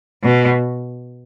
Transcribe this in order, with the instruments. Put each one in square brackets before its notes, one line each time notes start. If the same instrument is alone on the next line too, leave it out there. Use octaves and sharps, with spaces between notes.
[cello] B2